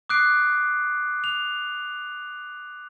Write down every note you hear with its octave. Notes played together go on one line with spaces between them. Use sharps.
D6 D#6 F#6 C7 D7
F7